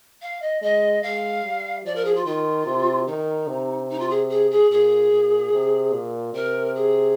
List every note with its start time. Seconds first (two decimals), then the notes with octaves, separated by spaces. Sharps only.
0.21 F5
0.42 D#5
0.62 G#3 D#5
1.02 G#3 F5
1.43 G3
1.84 F3 D5
1.95 A#4
2.05 G#4
2.15 F4
2.25 D#3 F4
2.66 C3
3.07 D#3 D#4
3.48 C3
3.90 D#4
3.99 F4
4.09 G#4
4.30 G#4
4.50 G#4
4.71 A#2 G#4
5.11 A#2
5.53 C3
5.93 A#2
6.34 C3 A#4
6.75 G#4